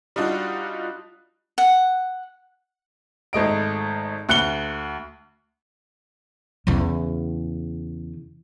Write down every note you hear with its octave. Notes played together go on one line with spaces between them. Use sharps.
G3 D4 D#4 F4 F#4
F#5
G#1 A3 D#5 D7
D2 F#6 C#7 G7
E2 C#3